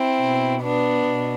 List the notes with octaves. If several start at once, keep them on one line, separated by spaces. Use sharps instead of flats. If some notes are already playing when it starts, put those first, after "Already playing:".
Already playing: C4 E4
B2
B3 D4
B2